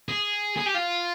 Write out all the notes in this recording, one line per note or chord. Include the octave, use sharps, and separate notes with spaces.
G#4
G#4
G4
F4